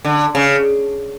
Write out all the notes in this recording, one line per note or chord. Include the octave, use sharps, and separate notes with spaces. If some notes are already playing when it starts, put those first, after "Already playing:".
D3
C#3